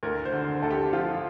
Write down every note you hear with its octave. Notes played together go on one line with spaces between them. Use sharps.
D2 A#4
C5
D3
D2 A4
G4
F3 F4